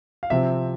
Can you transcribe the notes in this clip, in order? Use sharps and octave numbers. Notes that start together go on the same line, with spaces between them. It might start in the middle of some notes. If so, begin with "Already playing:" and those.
F5
C3 F3 C4 E5